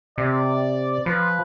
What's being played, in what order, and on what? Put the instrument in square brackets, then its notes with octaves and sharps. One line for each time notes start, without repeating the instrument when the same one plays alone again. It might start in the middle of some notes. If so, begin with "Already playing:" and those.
[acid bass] C3 [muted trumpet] D5
[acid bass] F3 [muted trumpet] B4